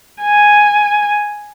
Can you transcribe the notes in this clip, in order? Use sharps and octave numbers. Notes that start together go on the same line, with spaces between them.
G#5